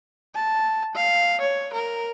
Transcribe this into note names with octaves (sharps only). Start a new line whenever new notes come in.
A5
F5
C#5
A#4